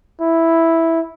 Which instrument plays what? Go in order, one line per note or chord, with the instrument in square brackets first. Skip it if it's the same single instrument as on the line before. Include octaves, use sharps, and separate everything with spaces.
[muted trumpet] E4